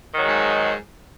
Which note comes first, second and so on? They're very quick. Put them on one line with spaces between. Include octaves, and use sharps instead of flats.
D#3 F#3 G#3 G#2